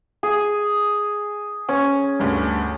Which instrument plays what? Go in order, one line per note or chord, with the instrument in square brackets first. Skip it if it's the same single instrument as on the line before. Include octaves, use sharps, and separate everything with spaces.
[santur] G#4
C#4
[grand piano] D2 G2